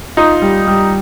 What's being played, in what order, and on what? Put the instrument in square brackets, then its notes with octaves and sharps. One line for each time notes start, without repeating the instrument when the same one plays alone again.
[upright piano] D#4 [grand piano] F4
[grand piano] G3
G3